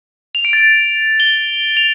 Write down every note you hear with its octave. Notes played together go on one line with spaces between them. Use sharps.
F7
D7
A6
G7
F7